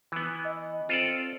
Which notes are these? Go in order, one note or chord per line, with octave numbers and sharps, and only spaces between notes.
E3 B3
D#5
C4 F4 A4 D5